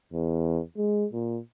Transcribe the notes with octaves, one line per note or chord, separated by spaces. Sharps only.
E2
G#3
A#2